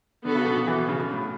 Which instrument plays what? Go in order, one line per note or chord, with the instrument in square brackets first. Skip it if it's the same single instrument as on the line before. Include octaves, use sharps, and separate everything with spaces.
[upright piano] D3 [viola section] B3 F#4 A4
[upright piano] C#3
B2
B2
E3
B2
C#3
B2
A2